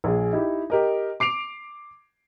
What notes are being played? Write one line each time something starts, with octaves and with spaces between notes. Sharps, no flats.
A#1 G#4
D#4 E4 G4
G4 A#4 D#5
D6 C7 D7 F7